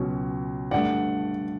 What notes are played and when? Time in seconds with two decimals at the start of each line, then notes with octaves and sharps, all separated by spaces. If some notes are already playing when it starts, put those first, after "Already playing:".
Already playing: C#2 B2 F#3 C#4
0.71 G2 D3 A3 D5 F#5